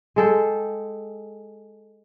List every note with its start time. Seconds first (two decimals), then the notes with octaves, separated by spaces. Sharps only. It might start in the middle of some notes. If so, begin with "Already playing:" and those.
0.16 G#3 A4 G5